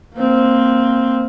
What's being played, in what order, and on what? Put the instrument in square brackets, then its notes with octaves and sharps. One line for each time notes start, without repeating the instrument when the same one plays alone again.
[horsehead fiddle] A#3 C4